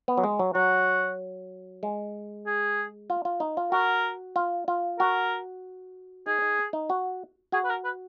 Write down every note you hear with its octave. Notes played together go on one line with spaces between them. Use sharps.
B3
F#3
G#3
F#3
F#3 F#4
G#3
G#4
F4
F4
D#4
F4
F#4 A#4
F4
F4
F#4 A#4
D#4 G#4
D#4
D#4
F#4
F#4 G#4
B4
A#4
B4